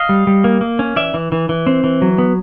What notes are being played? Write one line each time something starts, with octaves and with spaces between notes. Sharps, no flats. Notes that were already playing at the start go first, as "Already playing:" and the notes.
Already playing: D#5 F5
G3
G3
A#3
A#3
C#4
E3 D5 E5
E3
E3
E3
C4
E3
F#3
B3